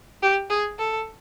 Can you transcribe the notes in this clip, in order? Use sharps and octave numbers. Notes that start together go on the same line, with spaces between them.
G4
G#4
A4